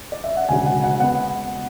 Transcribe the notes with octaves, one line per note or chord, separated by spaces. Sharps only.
D5
E5
F#5
E1 D2 C#3 G#5
F#5
F#5
B3 F#5